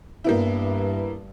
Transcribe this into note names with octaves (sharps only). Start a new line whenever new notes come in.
G2 A#3 B3 E4